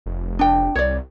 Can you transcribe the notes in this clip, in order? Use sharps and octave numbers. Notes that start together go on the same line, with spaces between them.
F1
D4 G5
C2 C#5 D5